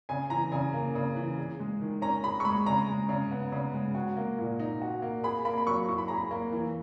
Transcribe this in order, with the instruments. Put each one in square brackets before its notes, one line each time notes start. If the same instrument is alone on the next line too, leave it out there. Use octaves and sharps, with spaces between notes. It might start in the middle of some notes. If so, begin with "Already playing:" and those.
[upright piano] C#3 [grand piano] G#5
[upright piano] E3 [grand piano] A#5
[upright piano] C#3 [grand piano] G#5
[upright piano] A#3
C#3
E3
G#4
G#3
D#3
[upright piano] C#4 [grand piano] A#5
[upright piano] G#4 [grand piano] B5
[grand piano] C#6
[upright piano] G#3 [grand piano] B5
[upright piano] C#3 [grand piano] A#5
[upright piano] G#3
C#3
B3
C#3
G#3
F#4
A#3
A#2
D#4
F#4
A#3
[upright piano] G#4 [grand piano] B5
[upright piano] A#3 [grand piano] B5
[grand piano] B5
[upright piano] F#3 [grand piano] C#6
[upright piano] E4 [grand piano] C#6
[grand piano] B5
[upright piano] G#4 [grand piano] A#5
[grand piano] B5
[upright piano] A#3
E3